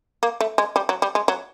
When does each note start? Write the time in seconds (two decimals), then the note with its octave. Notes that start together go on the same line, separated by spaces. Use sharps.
0.23 A#3
0.41 A3
0.58 G#3
0.76 G3
0.89 F#3
1.02 G3
1.15 G#3
1.28 F#3